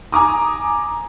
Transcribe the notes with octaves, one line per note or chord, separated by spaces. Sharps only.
G#5 A#5 D6 D#6